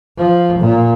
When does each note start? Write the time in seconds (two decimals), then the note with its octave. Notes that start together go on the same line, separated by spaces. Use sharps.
0.17 F3
0.59 A#2